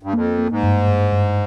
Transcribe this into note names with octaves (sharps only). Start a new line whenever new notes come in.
G2
F2 A#3
A#3
G#2
G2
G2
G2